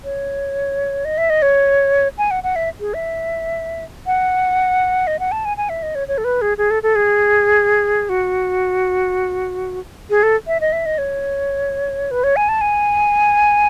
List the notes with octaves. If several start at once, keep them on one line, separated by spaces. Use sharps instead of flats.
C#5
D#5
E5
D#5
C#5
G#5
F#5
F#5
E5
G#4
E5
F#5
D#5
F#5
A5
G#5
G#5
E5
D#5
C#5
C#5
A4
B4
G#4
G#4
A4
A4
G#4
F#4
G#4
A4
E5
D#5
E5
D#5
C#5
B4
C#5
G#5
A5
G#5